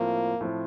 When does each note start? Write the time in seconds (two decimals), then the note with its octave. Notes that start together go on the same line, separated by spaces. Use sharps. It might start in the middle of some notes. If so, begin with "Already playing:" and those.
Already playing: A2 F3 A#3 C4 F4
0.41 A2 F3 C4 F4